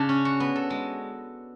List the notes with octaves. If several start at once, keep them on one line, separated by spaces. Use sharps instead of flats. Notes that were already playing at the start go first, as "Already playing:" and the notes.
Already playing: C#3 D4
C#4
F#4
B3
A4
G#3